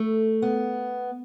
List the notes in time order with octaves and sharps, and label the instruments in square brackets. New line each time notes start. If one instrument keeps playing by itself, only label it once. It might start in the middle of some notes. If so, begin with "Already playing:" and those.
Already playing: [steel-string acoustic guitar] A3
B3